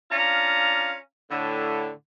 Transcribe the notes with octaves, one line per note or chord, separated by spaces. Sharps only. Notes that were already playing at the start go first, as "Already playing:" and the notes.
C#4 D4 F4 F5 A#5
A2 D3